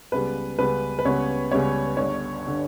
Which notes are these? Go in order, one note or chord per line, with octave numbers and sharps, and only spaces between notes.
C#2 C#3 G3 B3 B4
C#2 C#3 G3 B3 B4
B4
C#2 C#3 G3 B3 C#5
C#2 C#3 G3 B3 C#5
G1 G2 D3 C#5
D3